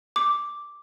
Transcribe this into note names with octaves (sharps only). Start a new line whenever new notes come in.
D6